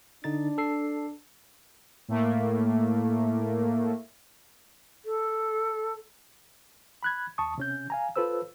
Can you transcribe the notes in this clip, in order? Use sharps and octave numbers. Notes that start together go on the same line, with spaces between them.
D3 D4 D#4 A6
A4 C7
A2 A3 A#3
A4
B5 F#6 G#6
D#2 A5 C#6 D#6
C3 C#4 G6
F5 G#5 A#5
F4 A4 B4 C5 E6